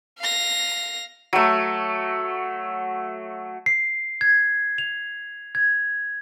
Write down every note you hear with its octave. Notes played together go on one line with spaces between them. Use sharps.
F5 A#6
F#3 A3
C7
G#6
F7
G#6